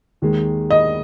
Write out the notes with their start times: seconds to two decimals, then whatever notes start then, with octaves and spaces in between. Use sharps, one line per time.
0.22 D#2 D#3 G#3
0.71 D#5